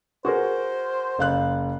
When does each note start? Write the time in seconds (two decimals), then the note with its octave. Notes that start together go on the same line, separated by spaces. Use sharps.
0.25 F#4 G#4 A#4 C5
1.19 F#1 F5 F#6